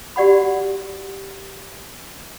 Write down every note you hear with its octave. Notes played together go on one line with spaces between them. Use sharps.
F#4 G4 D5 F#5 B5